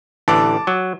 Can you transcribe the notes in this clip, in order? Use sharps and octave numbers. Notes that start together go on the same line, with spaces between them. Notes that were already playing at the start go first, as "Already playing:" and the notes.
A1 D3 E3 A5 D6
F#3